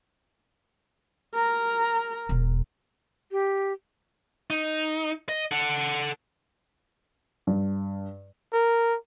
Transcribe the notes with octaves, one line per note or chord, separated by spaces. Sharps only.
A#4 A#5
E1
G4
D#4
D#5
A4 F#5
G2
A#4